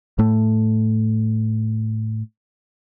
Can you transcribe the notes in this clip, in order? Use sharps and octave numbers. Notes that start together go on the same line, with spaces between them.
A2 A3